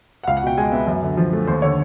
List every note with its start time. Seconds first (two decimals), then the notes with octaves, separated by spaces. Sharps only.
0.23 F#5
0.27 C#2 F5
0.37 F#5
0.42 B2 G5
0.58 G#3 G#5
0.72 B3 E5
0.87 F#2
1.03 D3
1.17 F3
1.33 A3
1.47 D#2 C5
1.62 D3 C#5